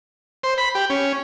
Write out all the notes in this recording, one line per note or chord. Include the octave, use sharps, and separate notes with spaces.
C5
B5
G4
C#4